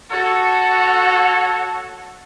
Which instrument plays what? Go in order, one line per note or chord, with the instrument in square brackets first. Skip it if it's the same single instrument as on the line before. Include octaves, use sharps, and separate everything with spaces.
[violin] F#4 [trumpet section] A4 C#5